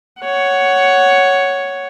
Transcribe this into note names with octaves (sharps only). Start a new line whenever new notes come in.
C#5 F#5